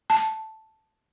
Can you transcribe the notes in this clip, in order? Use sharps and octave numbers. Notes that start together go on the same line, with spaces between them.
A5